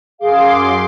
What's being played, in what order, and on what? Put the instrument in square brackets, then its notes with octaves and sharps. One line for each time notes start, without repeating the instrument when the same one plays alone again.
[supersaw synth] F#2 C6 D6 [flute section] G#4 F5